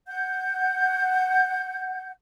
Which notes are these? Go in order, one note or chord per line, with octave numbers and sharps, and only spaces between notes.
F#5 G6